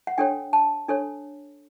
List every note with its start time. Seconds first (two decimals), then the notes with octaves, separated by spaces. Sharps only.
0.07 F#5
0.18 D4 A4 C#5 G5
0.53 A5
0.88 D4 A4 C#5